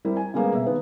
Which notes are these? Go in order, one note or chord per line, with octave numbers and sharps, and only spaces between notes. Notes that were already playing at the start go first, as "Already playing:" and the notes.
G3 C4 E4 A#4
G#5
C#3 G3 G#3 A#3 B3
B2 E5
D#3 B3 B4